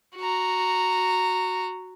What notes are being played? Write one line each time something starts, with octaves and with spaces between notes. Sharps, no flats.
F#4 A#5